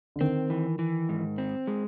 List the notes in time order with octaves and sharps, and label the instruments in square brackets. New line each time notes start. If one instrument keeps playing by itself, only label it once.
[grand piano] D3
[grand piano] D#3 [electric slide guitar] C4
[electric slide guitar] E3
E3
G#2
C4
G#3